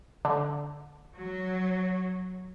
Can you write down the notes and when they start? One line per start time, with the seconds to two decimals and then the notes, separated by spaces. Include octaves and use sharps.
0.25 D3
1.14 F#3